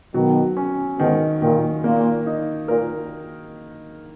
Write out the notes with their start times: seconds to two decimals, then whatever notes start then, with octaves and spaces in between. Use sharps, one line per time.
0.14 B2 D#3 F#3
0.57 C#4
0.98 G#2 B2 D#3
1.42 A#2 D#3
1.83 A#2 A#3
2.26 D#4
2.68 A#2 A#4